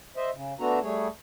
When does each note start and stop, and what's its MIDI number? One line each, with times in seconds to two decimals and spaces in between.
0.17 0.30 72
0.17 0.30 75
0.17 0.30 76
0.34 0.54 49
0.60 0.79 57
0.60 0.79 59
0.60 0.79 62
0.60 0.79 66
0.60 0.79 69
0.60 0.79 82
0.83 1.08 55
0.83 1.08 57
0.83 1.08 68
0.83 1.08 73